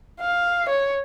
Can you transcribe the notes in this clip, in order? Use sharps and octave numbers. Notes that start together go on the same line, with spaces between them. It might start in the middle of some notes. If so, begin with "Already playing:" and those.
F5
C#5